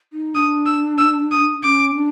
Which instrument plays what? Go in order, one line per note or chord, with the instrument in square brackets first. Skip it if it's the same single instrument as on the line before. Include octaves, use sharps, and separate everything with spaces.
[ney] D#4
[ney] D4 [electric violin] D#6
[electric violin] E6
E6
D#6
[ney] C#4 [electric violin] D6
[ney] D4